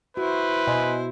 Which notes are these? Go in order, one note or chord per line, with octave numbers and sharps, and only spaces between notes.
E4 F#4 B4 C5
B2 D#5 G#5 C6